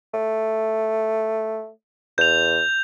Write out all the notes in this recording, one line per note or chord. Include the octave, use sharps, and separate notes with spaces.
A3
E2 G6 F7